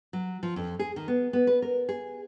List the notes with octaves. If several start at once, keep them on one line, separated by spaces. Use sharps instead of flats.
F#3
F3
F2
G#4
D#3
B3
B3
B4
A#4
G#4